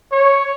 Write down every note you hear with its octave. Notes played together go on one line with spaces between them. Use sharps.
C#5